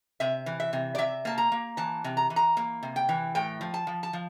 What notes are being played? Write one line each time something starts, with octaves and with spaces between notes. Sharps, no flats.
C3 E5
E3
E5
C3
D5
C3 E5
A#3 A5
A#5
A#3
E3 A5
C3
A#5
E3
A#5
A#3
C3
G5
E3
A2 G5
F3
A5
F3
A5
F3